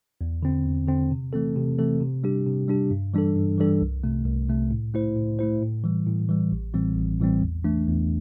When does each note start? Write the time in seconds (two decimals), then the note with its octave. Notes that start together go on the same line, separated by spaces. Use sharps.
0.21 E2
0.43 D3 C4
0.65 E2
0.88 D3 C4
1.11 C3
1.33 E3 A3 C4 A4
1.56 C3
1.78 E3 A3 C4 A4
2.01 C3
2.24 G3 D4 G4
2.46 C3
2.68 G3 D4 G4
2.91 G2
3.14 E3 G3 D4 A4
3.35 G2
3.58 E3 G3 D4 A4
3.81 C2
4.03 C3 A3
4.26 C2
4.49 C3 A3
4.71 A2
4.94 A3 E4 C5
5.16 A2
5.39 A3 E4 C5
5.62 A2
5.84 E3 G3
6.07 A2
6.29 E3 G3
6.52 A1
6.74 A2 E3 G3 C4
6.96 A1
7.20 A2 E3 G3 C4
7.42 E2
7.64 E3 A3 D4
7.87 E2